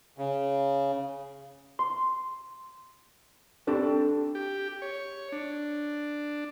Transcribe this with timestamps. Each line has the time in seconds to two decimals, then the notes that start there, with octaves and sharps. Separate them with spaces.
0.18 C#3
1.79 C6
3.67 C4 D4 G4 A4
4.35 G4
4.82 C#5
5.32 D4